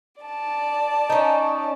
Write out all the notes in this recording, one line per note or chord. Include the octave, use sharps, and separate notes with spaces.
D5 A5
C#4 D#4